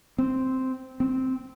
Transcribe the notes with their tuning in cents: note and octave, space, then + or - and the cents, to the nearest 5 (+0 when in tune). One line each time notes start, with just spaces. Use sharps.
C4 -5
C4 -5